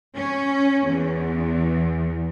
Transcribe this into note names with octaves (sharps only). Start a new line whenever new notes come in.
C#4
E2